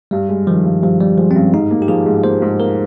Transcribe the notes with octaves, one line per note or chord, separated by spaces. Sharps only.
G2 G3
G#3
D#3 F3
G2
G2 F3
G2 G3
F3 G#3
C4
G2 C#4
G#2 D#4
A#3
G4
F3 G#4
G#2
A#3 C5
G#2
A#3 A#4